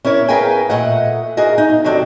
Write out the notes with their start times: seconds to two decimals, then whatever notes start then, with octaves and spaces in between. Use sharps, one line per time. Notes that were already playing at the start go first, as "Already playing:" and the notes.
0.05 C#4 E4 A#4 C#5
0.28 G#4 A#4 B4 F5 G5 G#5
0.70 A#2 A3 D#5 F#5
1.37 F#4 G#4 A#4 D#5
1.58 D#4
1.84 C3 D#3 F#3 D4 A4 D#5